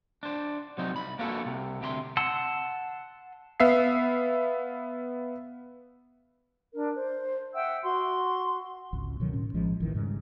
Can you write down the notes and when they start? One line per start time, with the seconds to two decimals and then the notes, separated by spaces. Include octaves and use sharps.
0.23 D4 C5
0.78 C3 F#3 C4 D#4
0.94 C2 B5
1.19 A#3 B3 D4 F4 F#4 A4
1.46 C2 C3
1.81 D2 C3 G4 A#5 C6
2.17 F#5 A5 C6 E6
3.60 B3 E5 F5 C7
6.73 D4 A#4
6.96 C5
7.54 E5 F#5 G5 E6
7.84 F#4 C6
8.93 G#1 C#2
9.20 B2 D3 D#3 F#3
9.33 A2 C#4
9.53 A#1 A2 F3 G#3
9.80 A1 E2 D#3 E3
9.95 G#2 C#3 F#3 G3